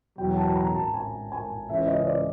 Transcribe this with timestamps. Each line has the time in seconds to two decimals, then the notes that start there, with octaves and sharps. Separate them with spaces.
0.18 E2 B2 F#3 G5
0.37 A5
0.56 A#5
0.75 A5
0.94 G#5
1.32 G#5
1.69 C#2 C#3 E3 E5
1.88 D#5
2.07 D5